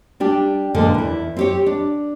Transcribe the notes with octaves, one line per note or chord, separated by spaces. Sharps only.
G3 D4 G4
G2 A#2 D3 F3 G#3
E2 E4
C4 G4 C#5
D4